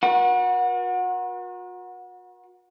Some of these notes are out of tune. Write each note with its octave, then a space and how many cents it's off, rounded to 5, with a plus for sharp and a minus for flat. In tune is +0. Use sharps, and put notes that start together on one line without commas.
F#4 -40 A#4 +45 F#5 -20